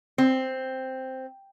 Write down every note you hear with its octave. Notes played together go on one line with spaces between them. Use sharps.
C4